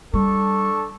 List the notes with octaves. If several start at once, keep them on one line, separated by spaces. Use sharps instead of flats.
G3 D4 A4 C#6